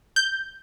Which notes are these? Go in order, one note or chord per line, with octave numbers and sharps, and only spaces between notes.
G6